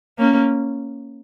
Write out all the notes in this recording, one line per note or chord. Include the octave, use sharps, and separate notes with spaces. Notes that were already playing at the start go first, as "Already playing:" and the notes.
A#3 C#4